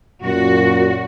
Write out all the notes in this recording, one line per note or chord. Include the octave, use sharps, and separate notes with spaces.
F#2 A#2 F#4